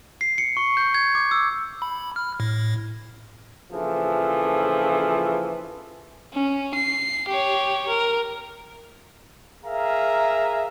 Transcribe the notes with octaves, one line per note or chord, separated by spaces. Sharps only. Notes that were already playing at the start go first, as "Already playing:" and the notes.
C7
C#7
C#6
G6
G#6
D6
E6
B5
F6
A2
A#1 C#3 E3 F3 A4
C#4
C7
G4 C#5
A#4
G#4 A#4 E5 F5 A#5